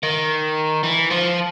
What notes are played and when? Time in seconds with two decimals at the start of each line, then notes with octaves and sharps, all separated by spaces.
0.03 D#3
0.83 E3
1.10 F3